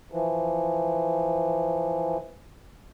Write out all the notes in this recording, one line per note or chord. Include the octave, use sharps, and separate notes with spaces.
E3 F3